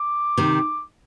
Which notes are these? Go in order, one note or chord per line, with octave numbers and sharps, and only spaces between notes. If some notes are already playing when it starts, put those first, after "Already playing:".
Already playing: D6
C3 D#3